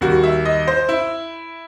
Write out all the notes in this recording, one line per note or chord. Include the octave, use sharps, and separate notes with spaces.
D#2 D#3 G3 F#4
E5
D#5
C5
E4